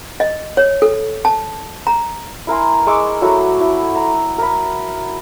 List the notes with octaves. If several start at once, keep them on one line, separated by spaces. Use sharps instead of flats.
D#5
C#5
A4
A5
A#5
E4 A#4 G#5 C6
G#3 C#6 D6 E6
F#3 A3 E4 F#4
E4
A#5
A#4 B5